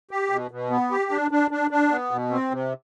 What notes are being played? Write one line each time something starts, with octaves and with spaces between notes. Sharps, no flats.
G4
B2
B2
B3
G4
D4
D4
D4
D4
B3
B2
C4
C3